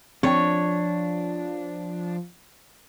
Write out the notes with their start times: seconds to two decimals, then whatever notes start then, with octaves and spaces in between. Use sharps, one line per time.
0.23 F3 C4 D4 C#5 G5